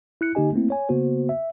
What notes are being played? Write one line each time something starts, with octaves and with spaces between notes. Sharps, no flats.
E4 F#6 C#7
D3 A#3 D#4 G4 D#5 G#5
A3 A#3 C4 E4
C#5 G#5
C#3 A#3 B3 F#4 C5
E5